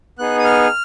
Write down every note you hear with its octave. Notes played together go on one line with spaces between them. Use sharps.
B3 D#4 G#4 F#6
D#6
F6